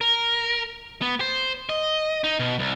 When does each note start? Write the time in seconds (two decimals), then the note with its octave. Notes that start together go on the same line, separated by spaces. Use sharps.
0.01 A#4
1.02 B3
1.20 C5
1.69 D#5
2.24 D#4
2.39 B2
2.59 C2